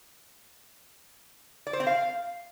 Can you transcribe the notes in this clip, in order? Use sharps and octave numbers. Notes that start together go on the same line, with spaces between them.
D5
C5
C4
F5